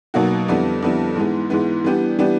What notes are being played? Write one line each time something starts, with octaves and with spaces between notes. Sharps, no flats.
B2 F#3 A#3 D#4 F#4
F2 D3 G3 B3 E4
F2 D3 G3 B3 E4
G#2 E3 G#3 B3
G#2 E3 G#3 B3
E3 G3 B3 D4 G4
E3 G3 B3 D4 G4